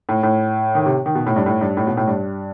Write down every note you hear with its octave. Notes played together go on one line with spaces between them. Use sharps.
A2
A2
D#3
C3
D#3
B2
A2
G2
A2
G2
A2
B2
A2
G2